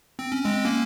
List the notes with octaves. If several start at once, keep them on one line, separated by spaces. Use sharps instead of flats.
C4
C#4
G#3 C4
A#3 C#4